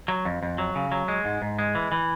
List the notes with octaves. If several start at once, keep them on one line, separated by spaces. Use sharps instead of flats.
F#3
F2
F2
F#3
C#3
F#3
G#3
G#2
G#2
G#3
E3
E3